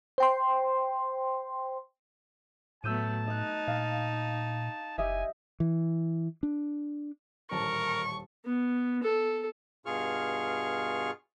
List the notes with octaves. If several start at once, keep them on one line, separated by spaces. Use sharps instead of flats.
C5 G5 C6
A2 F#3 A3 B3 A5 E6 G6 D#7
D#4 D#5 F#6
A#2 F5 A6
F#1 G4 D#5 E5 G#5
E3
D4
D#1 A1 A#4 A5 C#6
B3
A4
G2 B2 F4 G#4 C#6 F6